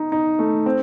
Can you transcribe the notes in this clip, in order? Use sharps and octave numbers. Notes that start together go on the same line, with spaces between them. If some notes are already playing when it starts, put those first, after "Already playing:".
Already playing: D#4
D#4
A3
C4